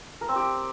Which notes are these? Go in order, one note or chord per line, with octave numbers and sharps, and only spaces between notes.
A#4
C4
G4